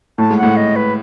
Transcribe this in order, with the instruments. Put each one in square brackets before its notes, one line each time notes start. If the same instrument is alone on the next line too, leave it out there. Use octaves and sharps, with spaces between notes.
[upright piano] A2 [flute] A5
[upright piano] G#2
[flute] F#5
[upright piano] A2
[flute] D#5
B4